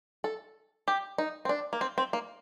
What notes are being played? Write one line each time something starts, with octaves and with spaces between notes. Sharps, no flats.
A4
G4
D#4
C4
D4
A#3
C4
C4
A#3